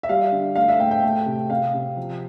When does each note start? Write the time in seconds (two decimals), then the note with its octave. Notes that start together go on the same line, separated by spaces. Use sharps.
0.03 E5
0.09 G3 F5
0.32 D3
0.56 A3 F5
0.68 E5
0.80 A2 G5
0.91 G5
1.03 A3
1.26 C3
1.50 C3 F5
1.74 C3
1.97 F3